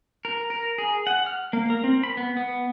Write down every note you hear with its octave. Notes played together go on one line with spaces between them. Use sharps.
A#4
A#4
G#4
F#5
F6
A#3
A#4
C4
B5
B3
B3